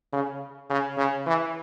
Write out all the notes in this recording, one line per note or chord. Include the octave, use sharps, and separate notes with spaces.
C#3
C#3
C#3
E3